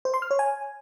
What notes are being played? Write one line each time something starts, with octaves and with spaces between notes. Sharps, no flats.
C5
C6
F6
C#5
G#5